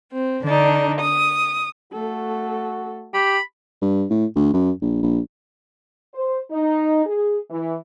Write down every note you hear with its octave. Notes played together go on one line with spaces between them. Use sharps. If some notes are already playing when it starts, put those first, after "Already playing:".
C4
D3 D4 D#4
D#6
A3 F#4 A4
G4 B5
G2
A2
D2
F#2
A#1
A#1
C5
D#4
G#4
E3